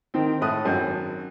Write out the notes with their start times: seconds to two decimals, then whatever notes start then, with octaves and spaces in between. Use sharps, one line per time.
0.14 D#3 C4
0.41 A2 A3 D#6 F#6
0.64 G#1 F#2 F#4